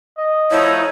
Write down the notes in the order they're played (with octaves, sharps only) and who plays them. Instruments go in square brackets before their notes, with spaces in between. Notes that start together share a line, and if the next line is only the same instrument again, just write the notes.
[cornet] D#5
[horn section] F3 A3 D#4 [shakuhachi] E4 [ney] C#5